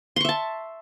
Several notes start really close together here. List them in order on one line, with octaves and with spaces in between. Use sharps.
C6 C#6 E5 A5